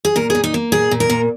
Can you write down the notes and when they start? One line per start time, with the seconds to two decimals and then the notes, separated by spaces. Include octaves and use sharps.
0.05 G#4
0.16 A#2 A#4
0.30 G#4
0.35 A#2
0.44 D#4
0.54 A#3
0.72 A#2 G#4
0.91 A#2
1.00 A#4
1.10 A#2